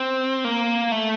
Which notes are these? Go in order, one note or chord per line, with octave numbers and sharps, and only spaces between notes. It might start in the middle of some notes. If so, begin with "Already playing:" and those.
Already playing: C4
A#3
A3